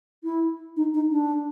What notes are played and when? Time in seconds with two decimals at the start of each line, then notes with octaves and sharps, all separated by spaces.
0.24 E4
0.77 D#4
0.94 D#4
1.11 D4